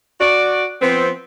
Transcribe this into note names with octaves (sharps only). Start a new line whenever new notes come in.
F#4 D5
F3 B3 C4